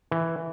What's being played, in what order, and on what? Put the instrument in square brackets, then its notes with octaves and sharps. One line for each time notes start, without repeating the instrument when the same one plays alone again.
[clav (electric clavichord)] E3